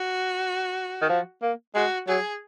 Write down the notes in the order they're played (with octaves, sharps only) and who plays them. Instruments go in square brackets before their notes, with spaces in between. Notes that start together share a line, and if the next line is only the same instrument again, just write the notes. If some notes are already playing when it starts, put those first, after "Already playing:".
Already playing: [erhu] F#4
[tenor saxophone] D#3
F3
A#3
[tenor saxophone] G#3 [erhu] F#4
[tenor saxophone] F#3 [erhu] G#4